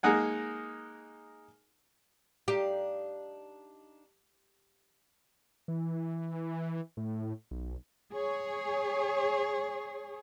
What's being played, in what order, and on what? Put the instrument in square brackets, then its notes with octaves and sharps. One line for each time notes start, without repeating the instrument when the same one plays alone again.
[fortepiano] G#3 A#3 D#4 F#5 G#5
[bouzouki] D4 D#4 F5 [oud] G4
[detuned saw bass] E3
A2
B1
[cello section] G#4 C#5